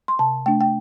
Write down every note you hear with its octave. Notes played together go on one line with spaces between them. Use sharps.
C6
C3 A5
A3 D4 G5
G5